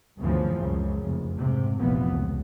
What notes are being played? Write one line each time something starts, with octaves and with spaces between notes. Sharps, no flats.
G1 D2 C#3 E3 F3
C#2 F#2 C#3
F1
G#2 C3
F1 A#1 F2 A#2 E3 B3
C#2